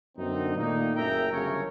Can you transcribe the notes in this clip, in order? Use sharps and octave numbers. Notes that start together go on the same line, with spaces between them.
F#2 D3 B3 C4 D#4
A#2 D#3 A3 A#3 D#4
F#1 C#3 A#4 E5 G5 A#5
G1 C#3 F#3 A3 A#4 C#5